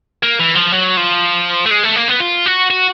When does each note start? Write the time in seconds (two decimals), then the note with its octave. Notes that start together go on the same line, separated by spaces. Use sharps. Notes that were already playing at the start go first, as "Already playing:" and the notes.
0.23 A#3
0.39 E3
0.55 F3
0.72 F#3
0.97 F3
1.66 A3
1.71 G#3
1.83 A3
1.96 A#3
2.08 B3
2.20 F4
2.46 F#4
2.70 F#4